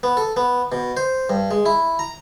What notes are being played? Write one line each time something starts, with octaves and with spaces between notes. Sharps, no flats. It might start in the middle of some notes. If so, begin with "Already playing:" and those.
B3
A4
B3
B2
C5
G2
G#3
E4
A#5